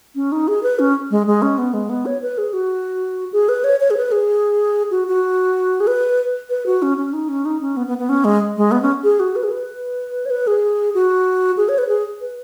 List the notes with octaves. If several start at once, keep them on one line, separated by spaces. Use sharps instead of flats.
C#4
D#4
G#4
B4
C#4
G#3
G#3
C#4
B3
G#3
B3
C#5
B4
G#4
F#4
G#4
B4
C#5
C#5
G#4
B4
G#4
F#4
F#4
G#4
B4
B4
F#4
C#4
C#4
D#4
C#4
D#4
C#4
B3
B3
B3
C#4
G#3
G#3
B3
C#4
G#4
F#4
B4
G#4
B4
C#5
B4
G#4
F#4
G#4
C#5
B4
G#4
B4